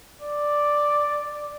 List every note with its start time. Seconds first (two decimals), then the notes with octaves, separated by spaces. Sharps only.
0.22 D5